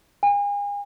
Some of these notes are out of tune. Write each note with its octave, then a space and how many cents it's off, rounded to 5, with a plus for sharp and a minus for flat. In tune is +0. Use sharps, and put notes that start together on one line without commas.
G#5 -40